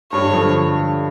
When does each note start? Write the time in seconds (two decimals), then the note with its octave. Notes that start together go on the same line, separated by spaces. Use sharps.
0.12 G2 C#5
0.30 D3 F3